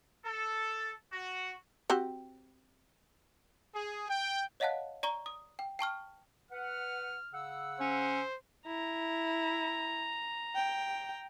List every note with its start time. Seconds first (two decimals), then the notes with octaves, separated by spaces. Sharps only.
0.25 A4
1.12 F#4
1.90 C4 F#4 G4
3.74 G#4
4.09 G5
4.60 C#5 D#5 F5 F#5 A5 F#6
5.03 D5 A#5 C#6 G7
5.26 D#6
5.59 G5
5.79 G5 A5 C#6 F6
6.51 B4 F#5 F6
7.33 C#3 F#5 E6
7.80 C#4 C5
8.67 E4 A#5
10.55 G5